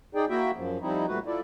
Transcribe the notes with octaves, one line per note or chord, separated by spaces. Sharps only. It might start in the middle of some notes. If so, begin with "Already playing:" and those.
D#4 G#4 D5 G5
A#3 E4 F#4 E5 G5
F#2 F3
F3 G3 C4 D#4 E4
A#2 G3 A3 F#4 B4
E4 F4 A4 D5